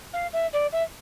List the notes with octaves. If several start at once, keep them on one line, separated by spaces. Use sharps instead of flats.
F5
E5
D5
E5